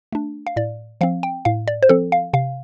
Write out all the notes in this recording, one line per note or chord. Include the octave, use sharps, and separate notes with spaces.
A3 D4
F5
A2 D5
F3 C4 F5
G5
A2 F5
D5
C5
F3 C4 A4
F5
C3 F5